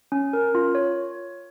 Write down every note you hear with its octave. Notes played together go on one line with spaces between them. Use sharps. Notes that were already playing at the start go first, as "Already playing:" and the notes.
C#4
A#4
F4
C#5